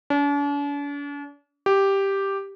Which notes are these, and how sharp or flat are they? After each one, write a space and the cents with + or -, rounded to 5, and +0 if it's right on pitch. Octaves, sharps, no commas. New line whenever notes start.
D4 -45
G4 +0